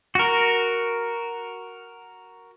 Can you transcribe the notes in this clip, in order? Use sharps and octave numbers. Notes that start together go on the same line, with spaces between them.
F#4 A#4